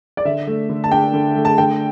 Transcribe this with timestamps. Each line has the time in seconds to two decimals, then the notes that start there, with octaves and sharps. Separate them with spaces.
0.17 D5
0.25 D3 E5
0.47 A3
0.69 D3
0.84 A5
0.91 D4 G5
1.13 D3
1.36 A3
1.45 A5
1.58 D3 G5